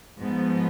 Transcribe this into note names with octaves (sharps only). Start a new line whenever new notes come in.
G#2 F3 B3